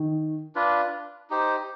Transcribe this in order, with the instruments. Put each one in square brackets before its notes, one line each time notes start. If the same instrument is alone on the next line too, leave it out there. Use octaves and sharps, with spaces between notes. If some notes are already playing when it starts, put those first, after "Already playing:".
Already playing: [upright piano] D#3
[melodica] D4 F4 B4
D#4 G4 C5